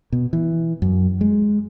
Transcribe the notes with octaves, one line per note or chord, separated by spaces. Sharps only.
B2
E3
F#2
G#3